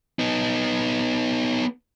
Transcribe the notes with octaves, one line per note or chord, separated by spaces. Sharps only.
B3 D#4